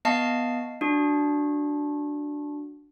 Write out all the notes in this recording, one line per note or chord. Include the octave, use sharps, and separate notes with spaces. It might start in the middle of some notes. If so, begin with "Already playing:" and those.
B3 D#5 F5 A5 C7
D4 F#4